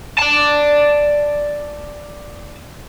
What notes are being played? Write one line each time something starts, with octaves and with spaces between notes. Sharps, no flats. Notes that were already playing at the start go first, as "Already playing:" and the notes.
D5 A5